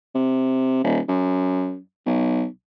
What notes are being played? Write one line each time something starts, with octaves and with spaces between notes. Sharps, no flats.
C3
D#1
F#2
B1